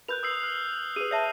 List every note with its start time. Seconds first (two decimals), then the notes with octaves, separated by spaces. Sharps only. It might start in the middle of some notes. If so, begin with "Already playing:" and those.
0.08 A#4 B4 B5 F#6 G6 F7
0.23 D#6 E6 C7
0.43 F6
0.96 G#4 B4 D#6 D#7
1.11 C#5 E5 A5 C7